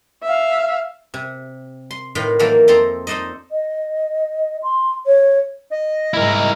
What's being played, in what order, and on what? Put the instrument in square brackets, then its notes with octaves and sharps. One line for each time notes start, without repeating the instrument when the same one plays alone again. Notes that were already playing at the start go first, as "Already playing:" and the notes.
[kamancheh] E5 F5
[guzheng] C3
C6
A2 D#3 F4 B4 G5
D#3 E3 F#3 A#3 E4 A4
F2 C4 A4 A#5 C6
D#4 A4 C5 D5 D#5
[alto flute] D#5
C6
C#5
[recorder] D#5
[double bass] G#2 [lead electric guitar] E4 A#4